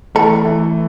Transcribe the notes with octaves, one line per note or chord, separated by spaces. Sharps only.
E3 A3 A4
E3 A3